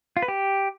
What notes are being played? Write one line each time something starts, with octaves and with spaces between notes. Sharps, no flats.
F4
B4
G4